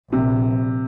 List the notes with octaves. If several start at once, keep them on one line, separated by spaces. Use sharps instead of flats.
A#1 C3